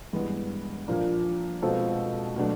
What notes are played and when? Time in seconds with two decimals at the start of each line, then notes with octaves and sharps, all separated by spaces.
0.13 G2 E3 G#3 B3
0.88 A#2 F3 A#3 D4
1.62 B2 G#3 C4 F4 A4
2.36 B2 F#3 A3 D4